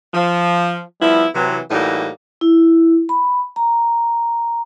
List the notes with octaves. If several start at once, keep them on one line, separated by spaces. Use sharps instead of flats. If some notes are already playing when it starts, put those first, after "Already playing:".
F3
F3 G3 B3 E4
C3 E3 F#3
A2 E3 G3 A#3 D#4 F#4
E4
B5
A#5